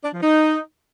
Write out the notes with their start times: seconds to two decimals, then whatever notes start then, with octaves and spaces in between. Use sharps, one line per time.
0.04 D4
0.14 F3
0.23 D#4